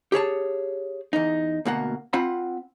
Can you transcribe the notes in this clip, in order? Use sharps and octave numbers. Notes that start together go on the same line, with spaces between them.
G4 G#4 C#5 A5
E2 D#4
D2 B2 A#3 F#5
C4 F4 F#5 B5